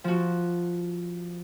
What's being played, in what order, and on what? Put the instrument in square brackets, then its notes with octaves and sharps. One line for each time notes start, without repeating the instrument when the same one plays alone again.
[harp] F3 F#4